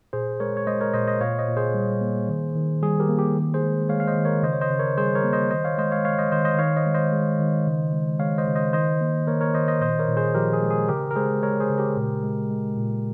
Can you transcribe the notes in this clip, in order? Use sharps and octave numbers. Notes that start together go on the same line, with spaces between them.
A#2 G#4 C5
G#3 A#4 C#5
C#5
G#3 C5 D#5
A#4 C#5
A#2 C5 D#5
C5 D#5
A#2 C#5 F5
C5 D#5
A#2
G#4 C5
G3
A#3
D#3
D#3
G3 G#4
G4 A#4
A#3
G4
D#3
G#4 C5
G#3
G#3 C#5 F5
F5
C5 D#5
D#3
A#4 C#5
C#3 C5 D#5
C#5
C5 D#5
C#3
A#4 C#5
G3 G#4 C5
A#4 C#5
A#3
C5 D#5
D#3 C5 D#5
C#5 F5
G#3 C5 D#5
C#5 F5
G#3 C#5 F5
C5 D#5
D#3 C5 D#5
C5 D#5
D#3 C#5 F5
C5 D#5
G#3
C5 D#5
G#3
D#3
C#3
G#3
G#3 C#5 F5
C5 D#5
C#3
C5 D#5
D#3 C5 D#5
A#3
A#3 A#4 C#5
A#4 C#5
D#3 C5 D#5
C5 D#5
A#2 C5 D#5
A#4 C#5
A#2
G#4 C5
F3 G4 A#4
G#4
G#3
G#4
C#3 G4 A#4
A#4
G#3 G#4 C5
G#3 A#4 C#5
G#4 C5
C#3
G4 A#4
A#2
G#3
G#3
A#2